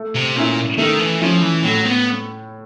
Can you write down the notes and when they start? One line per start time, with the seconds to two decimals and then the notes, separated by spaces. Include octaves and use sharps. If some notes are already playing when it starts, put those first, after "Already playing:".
Already playing: A3
0.15 C3
0.36 A#2 C#4 E4
0.78 D#3 A3
1.00 E3
1.21 F3 C#4 E4
1.42 E3
1.64 A2 F#3
1.85 B3